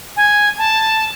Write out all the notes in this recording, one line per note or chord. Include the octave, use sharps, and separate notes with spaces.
G#5
A5